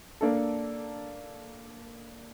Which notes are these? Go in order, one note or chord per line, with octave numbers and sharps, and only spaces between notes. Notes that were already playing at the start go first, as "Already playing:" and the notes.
A#3 D4 A4